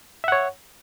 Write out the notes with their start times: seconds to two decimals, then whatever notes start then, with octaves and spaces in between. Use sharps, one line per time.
0.24 E5
0.28 F#5
0.32 C#5